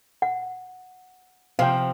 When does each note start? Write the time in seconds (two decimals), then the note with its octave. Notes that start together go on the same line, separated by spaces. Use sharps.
0.22 F#5
1.59 C3 F3 F5 G5